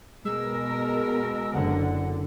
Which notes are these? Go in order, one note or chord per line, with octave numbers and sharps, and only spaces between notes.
B2 G#3 A#4 E6
F#1 D3 F#5